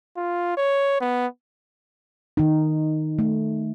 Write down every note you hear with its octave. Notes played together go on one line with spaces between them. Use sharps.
F4
C#5
B3
D#3 D#4
A3